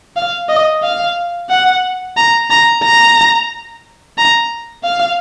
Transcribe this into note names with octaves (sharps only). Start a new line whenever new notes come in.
F5
D#5
F5
F#5
A#5
A#5
A#5
A#5
F5